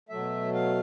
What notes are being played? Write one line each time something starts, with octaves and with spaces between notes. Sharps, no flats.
B2 F#3 A3 E5
F5